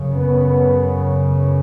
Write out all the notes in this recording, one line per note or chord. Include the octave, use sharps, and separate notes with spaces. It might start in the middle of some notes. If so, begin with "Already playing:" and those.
Already playing: F#2 C#3
B3